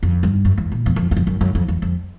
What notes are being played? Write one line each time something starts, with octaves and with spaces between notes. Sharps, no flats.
F2
G2
F#2
E2
A#2
E2
F2
E2
F2
F#2
F#2
F2
E2
F2